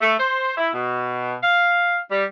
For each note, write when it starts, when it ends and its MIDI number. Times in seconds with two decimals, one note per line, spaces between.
0.01 0.15 57
0.20 0.53 72
0.58 0.69 64
0.74 1.35 47
1.43 1.98 77
2.12 2.25 55